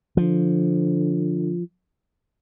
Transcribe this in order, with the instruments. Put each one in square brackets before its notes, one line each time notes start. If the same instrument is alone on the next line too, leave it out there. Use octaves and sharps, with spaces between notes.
[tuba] D3 [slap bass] F3